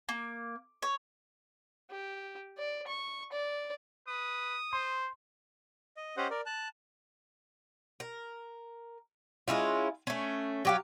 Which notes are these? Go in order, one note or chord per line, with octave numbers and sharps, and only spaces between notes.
A#3
C#5
G4
D5
C#6
D5
B4 D#6
C5 C6
D#5
C#4 G4 C5 D#5 F#5
A#4 D5
A5 F#6
A#4
G#3 C#4 E4 F4
A3 C#4
F#3 G4 F5